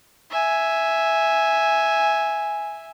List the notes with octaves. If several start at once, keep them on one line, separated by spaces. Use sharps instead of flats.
E5 G#5